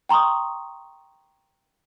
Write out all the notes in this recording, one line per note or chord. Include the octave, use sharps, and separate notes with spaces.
G5 A#5 C6 C#6 D#6